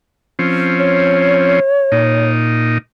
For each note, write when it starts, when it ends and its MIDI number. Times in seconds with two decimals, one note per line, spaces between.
0.39 1.60 53
0.39 1.60 60
0.39 1.60 61
0.78 2.30 73
1.92 2.78 46
1.92 2.78 63